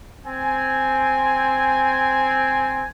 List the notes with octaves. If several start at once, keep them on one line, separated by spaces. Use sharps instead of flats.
C4 G#5